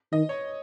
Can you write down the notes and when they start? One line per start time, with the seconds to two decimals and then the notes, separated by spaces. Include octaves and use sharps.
0.12 D#3 D#5
0.29 C#5